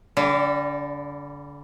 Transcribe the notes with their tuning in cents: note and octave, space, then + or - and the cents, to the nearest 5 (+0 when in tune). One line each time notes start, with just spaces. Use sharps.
D3 -35 G3 +0